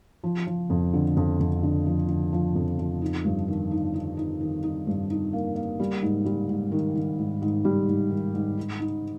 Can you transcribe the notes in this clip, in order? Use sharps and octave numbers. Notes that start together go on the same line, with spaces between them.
F3
F3
F2
D3
F2
F2
D3
F3
D3
F3
F2
F3
D#4
G2
D#3
D#4
D#4
D#4
D#3
D#4
G2
D#4
A#3
A#3
G3
G#2
G3
G#2
D#3
D#3
G#2
G#2
G3
G#2
D#3
G#2
D#4
D#4